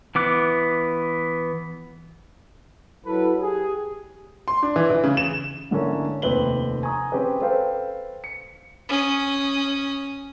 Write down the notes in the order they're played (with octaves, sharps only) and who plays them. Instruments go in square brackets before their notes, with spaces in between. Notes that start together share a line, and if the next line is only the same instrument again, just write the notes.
[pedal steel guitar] E3 B3 D6 F#6
[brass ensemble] F#3 E4 A4 B4
G4 G#4
[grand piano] C6
D4
E3
E3
C#3
E7
G#2 D3 A#3 C#4 E4
F1 D#2 C4 B4 F#7 G7
G#5 A#5 C#6 D#6
C4 C#4 G4 G#4 B4
A4 B4 C5 F5 G5
C#7
[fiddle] C#4 D#6